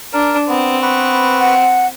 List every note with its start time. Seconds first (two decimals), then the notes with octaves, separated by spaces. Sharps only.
0.13 D4 A#4
0.49 B3 C4
0.82 B3 B4 C#6
1.40 F#5